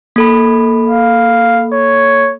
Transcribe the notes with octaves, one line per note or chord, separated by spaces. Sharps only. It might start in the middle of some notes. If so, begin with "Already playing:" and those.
A#3 A4 B5
F5
C#5